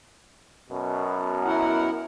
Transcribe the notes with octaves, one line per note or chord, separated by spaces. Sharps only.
F#2 B2
E4 A#4 F#5